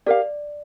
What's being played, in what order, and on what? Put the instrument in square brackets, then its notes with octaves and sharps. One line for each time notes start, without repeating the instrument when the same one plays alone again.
[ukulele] G4 A#4 F5 [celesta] D5